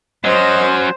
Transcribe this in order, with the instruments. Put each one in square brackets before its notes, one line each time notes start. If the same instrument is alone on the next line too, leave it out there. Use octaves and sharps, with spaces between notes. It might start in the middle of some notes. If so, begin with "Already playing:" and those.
[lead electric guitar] F#3 C#4 [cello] C5 [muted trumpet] D#5